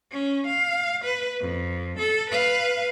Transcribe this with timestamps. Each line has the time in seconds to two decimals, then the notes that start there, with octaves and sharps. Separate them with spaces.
0.12 C#4
0.47 F5
1.04 B4
1.40 F2
1.99 A4
2.30 B4 F5